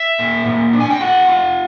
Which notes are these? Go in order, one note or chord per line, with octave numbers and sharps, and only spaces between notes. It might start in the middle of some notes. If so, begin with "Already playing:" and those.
Already playing: E5
A#2
A#2
D4
G#5
G5
F4 F#5
F4